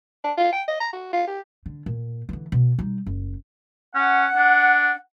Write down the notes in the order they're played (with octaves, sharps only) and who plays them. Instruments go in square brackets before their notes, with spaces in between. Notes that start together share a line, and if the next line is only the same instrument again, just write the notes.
[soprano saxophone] D4
F4
G5
D#5
A#5
F#4
F4
G4
[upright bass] D3
A#2
D3 E3
B2
G3 D#4
F#1
[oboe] C#4 [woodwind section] F#5
[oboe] D4